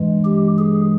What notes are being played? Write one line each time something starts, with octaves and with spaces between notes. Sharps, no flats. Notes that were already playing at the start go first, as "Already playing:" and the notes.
Already playing: G2 E3 G#3
G4
G#4